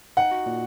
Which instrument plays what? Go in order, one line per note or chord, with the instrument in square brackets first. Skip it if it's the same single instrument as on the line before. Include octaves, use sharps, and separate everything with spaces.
[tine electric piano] D#4 [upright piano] F#5
[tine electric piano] F#4
A#2